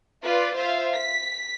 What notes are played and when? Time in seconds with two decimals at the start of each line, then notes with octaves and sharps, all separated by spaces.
0.23 F4 B4 D5
0.56 F4 C5 E5 F5
0.95 B6